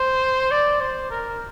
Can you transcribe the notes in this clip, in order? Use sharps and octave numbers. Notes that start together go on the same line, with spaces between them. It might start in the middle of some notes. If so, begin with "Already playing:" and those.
Already playing: C5
D5
C5
A#4